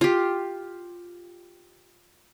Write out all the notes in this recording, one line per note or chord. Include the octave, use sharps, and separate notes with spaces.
F4 G4